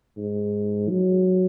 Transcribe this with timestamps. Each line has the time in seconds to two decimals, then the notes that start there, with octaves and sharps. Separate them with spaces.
0.18 G#2
0.89 F#3